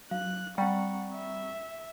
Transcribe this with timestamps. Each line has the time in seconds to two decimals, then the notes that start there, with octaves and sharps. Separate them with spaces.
0.11 F#3 F5 F#6
0.58 G3 C4 F#5 G5 A#5 C#6
1.15 E5